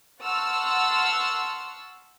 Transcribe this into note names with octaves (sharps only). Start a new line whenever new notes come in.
F#5 A5 C6 C#6 E6 F6